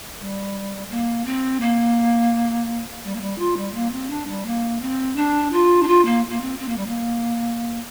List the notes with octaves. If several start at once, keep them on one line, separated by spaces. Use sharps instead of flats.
G3
A#3
C4
A#3
G3
A#3
G3
F4
G3
A#3
C4
D4
G3
A#3
C4
D4
F4
D4
F4
A#3
A#3
C4
C4
A#3
G3
A#3